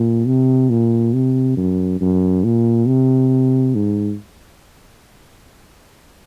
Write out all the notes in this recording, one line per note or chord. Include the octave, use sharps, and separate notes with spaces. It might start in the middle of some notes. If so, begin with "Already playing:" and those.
Already playing: A#2
C3
A#2
C3
F#2
F#2
A#2
C3
G#2